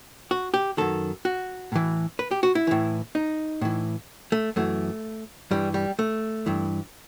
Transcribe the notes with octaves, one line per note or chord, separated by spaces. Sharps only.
F#4
G4
F#2 D#3 A4
F#4
A2 E3
B4
G4
F#4
E4
A2 E3
D#4
A2 E3
A3
F#2 E3 A3
G2 E3 G3
G3
A3
G2 E3